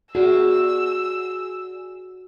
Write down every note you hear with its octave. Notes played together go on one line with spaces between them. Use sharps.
F#4 G#4 D5 E6